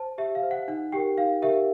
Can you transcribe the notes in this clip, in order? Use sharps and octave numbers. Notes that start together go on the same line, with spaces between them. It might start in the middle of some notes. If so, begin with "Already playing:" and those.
Already playing: C5 A5
G4 E5
F5
C5
F#5
D#4 F#5
G4 A#4 G5
D#4 F5
G4 A#4 E5